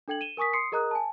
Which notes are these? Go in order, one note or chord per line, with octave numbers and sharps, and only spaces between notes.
D4 A4 G5 G#6 F#7
D#7 E7 G7
A#4 G#5 C#6 D#6 B6
C6 D#6 C7 C#7
G#4 A#4 D#5 A#5 D#6 F#6
G#5 A5